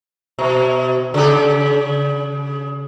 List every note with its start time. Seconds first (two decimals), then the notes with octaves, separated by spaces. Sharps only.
0.39 B2
1.14 C#3 G4